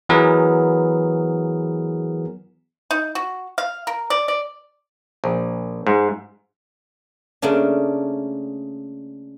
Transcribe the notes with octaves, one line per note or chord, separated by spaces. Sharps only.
E3 F#3 B3 G#4 A#4
D#4
F#4
F5
A#4
D5
D5
A#1
G#2
C#3 A3 A#3 D4